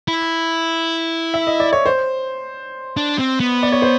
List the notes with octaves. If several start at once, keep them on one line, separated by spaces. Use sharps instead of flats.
E4
E5
D#5
D5
C#5
C5
D4
C4
B3
D5
C#5
C5